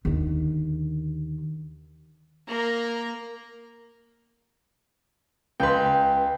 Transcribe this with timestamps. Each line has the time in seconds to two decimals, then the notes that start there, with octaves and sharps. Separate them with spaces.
0.05 D#2 D3
2.48 A#3 A#5
5.60 C#2 B4 G5 C6